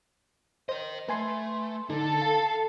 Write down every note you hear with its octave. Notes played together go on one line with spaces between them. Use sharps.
A#4 C5 D#5
A3 B4 G#5 C6
D3 D#4 A4
F5 A5